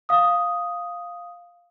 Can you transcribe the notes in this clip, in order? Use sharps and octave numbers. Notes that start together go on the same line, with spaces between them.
F5 D#6